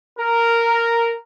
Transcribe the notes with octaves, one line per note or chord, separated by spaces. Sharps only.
A#4